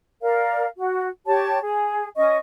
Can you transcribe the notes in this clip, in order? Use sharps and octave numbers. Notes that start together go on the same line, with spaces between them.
A#4 D5 F5
F#4
G4 C#5 A5
G#4
C#4 D#5 C#6